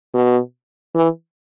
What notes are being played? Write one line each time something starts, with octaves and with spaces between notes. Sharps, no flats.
B2
E3